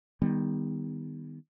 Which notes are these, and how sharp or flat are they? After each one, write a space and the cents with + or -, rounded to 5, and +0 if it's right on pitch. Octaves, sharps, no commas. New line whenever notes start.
D#3 +0 G3 +20 B3 +0